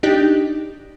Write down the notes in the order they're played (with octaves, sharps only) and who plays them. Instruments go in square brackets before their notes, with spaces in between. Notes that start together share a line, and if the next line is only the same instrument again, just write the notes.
[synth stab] D4 D#4 G4